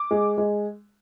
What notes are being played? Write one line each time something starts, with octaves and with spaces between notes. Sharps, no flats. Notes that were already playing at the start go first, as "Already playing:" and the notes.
Already playing: D6
G#3
G#3